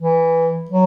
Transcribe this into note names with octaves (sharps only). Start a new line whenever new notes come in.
E3
F#3